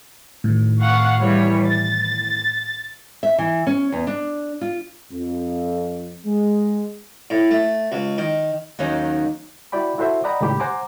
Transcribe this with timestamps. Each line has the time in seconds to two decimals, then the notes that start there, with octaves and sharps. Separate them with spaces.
0.44 A2 D#3
0.80 F5 F#5 C#6
1.20 E3 G3 C#5
1.65 A6
3.23 E5
3.38 E3
3.67 C#4
3.92 E2
4.07 D4
4.61 F4
5.11 F2
6.25 G#3
7.30 A2
7.51 A3
7.92 C#2
8.18 D#3
8.79 D#2 D#3 F#3 C#4 D#4
9.72 E4 F#4 D5 G5 B5
9.98 E4 F#4 A4 C5 E5
10.24 D5 D#5 F#5 G5 A#5 B5
10.41 C#2 A2 D#3 G4 B5
10.60 C5 F#5 G#5 A#5 D6